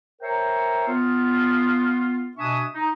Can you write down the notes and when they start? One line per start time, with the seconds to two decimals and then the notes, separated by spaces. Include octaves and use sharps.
0.22 A#4 C5 C#5 E5 G5 A#5
0.87 B3 F4
2.37 B2 D4 E5 G#5 C#6 D#6
2.74 D#4